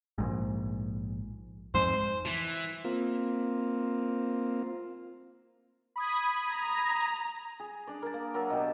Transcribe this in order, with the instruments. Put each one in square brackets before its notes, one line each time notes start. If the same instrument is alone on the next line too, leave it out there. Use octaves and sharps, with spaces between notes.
[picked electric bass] A#1 G#2
[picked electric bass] F2 G#2 [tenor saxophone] C5
[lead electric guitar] E3
[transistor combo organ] A#3 C4 F4
[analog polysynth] B5 D#6 G#6
[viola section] A#5
[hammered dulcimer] G#4
D4 D5
A#4 A5
A#3
F#3 A#4 E5 A5
B2 G4